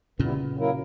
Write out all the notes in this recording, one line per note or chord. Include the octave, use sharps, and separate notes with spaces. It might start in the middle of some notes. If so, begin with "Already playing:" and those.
A#2 C#3 E3 G3 B3 E4
F#3 A#3 E4 A#4